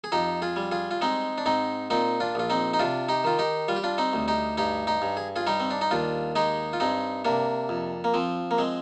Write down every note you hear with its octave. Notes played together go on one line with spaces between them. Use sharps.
G#4
F2 D#4 G4
F4 G#4
G3
F4 G#4
F4
G#3 C4 D#4
D4
G#2 C4 D#4
A#2 C4 D#4
D4 F4
A#1 F4
C4 D#4
D#4
C3 D4 F4
D#4 G4
D#3 F4
D#4 G4
G3 F4
G4
D4 F4
C4 D#4
D2
D#4 G4
G2 D#4 G4
D#4 G4
G2
G#4
F4 G#4
G3 D#4 G4
C4
D4
D#4
D#2 D4 F4
G#3 D#4 G4
F4
G2 C4 D#4
C3 A#3 D4
F2
A#3
F3 C4
A#3
G#3 C4